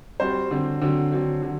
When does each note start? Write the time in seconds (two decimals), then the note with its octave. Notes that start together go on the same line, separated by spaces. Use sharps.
0.20 G3 C4 F#4 C5
0.51 D3 F#3 C4
0.81 D3 F#3 C4
1.12 D3 F#3 C4
1.42 D3 F#3